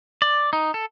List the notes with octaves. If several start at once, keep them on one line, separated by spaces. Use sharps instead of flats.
D5
D#4
A4